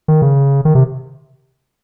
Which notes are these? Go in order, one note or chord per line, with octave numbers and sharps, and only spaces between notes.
D#3
C#3
D#3
C3